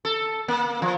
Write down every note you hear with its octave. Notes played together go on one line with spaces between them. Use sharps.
A4
A#3
F3